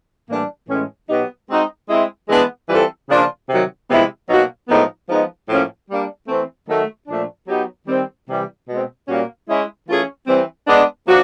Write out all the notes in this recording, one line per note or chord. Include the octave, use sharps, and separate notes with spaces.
A2 E3 G3 A#3 D4
A2 E3 G#3 C#4
B2 F#3 B3 D#4 G4
G#3 C4 D#4 F#4
G#3 C4 E4
E3 G#3 B3 D4
E3 G3 C4 F4 A4
C#3 F3 A#3 D4 F4
C3 D#3 F#3
C3 F3 G#3 B3 E4
B2 F#3 A#3 D#4 F#4
A2 F3 G#3 B3 D#4
F3 G#3 B3 D#4
A2 F3 A#3 C#4
G3 A#3 D4
E3 A3 C4
D#3 F#3 A3
A#2 F3 A3 D4
F#3 B3 D#4 G4
D#3 G3 C4
C3 E3 G3
B2 G#3 C4
A#2 G3 A#3 C#4 F#4
G#3 C#4 E4
E3 A3 C#4 F4 G#4
E3 G3 C4
G#3 B3 D4
F3 A#3 D4 F#4